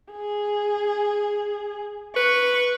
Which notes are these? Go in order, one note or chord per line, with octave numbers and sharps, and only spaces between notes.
G#4
B4 C#6